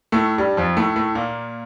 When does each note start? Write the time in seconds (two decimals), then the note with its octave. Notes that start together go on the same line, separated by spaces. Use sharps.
0.12 A2 A3
0.38 G2 G3
0.57 F2 F3
0.77 A2 A3
0.96 A2 A3
1.15 A#2 A#3